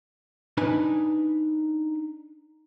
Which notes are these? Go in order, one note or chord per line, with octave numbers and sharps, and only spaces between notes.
D4 D#4 B4 G#5